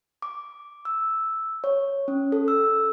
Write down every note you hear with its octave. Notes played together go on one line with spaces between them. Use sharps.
D6
E6
C#5
C#4
A4
E6